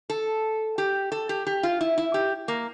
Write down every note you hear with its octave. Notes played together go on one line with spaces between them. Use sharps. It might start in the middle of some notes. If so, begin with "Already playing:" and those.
A4
G4
A4
G4
G4
F4
E4
E4
G4
A#3